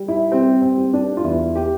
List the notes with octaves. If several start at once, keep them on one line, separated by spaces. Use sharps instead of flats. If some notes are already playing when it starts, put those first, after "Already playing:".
Already playing: G3
E4
G3 C4
C4
G3
D4
F4
E2 E4
G4